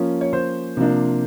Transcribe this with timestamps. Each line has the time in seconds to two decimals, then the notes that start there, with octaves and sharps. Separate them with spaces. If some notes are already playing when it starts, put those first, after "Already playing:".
Already playing: F3 A#3 C#4
0.21 C#5
0.33 C5
0.77 C3 F3 A#3 D4